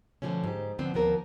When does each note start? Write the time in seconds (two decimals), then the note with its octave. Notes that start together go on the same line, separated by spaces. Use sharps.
0.22 B2 D3 F3 A3 C#4
0.44 G#2 G4
0.79 D3 F3 B3 C4
0.94 D#2 F3 B3 A#4